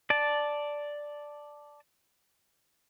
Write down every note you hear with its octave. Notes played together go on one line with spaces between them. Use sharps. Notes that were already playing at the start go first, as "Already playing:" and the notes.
D5 A5